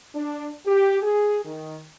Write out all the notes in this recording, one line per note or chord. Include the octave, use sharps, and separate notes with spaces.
D4
G4
G#4
D#3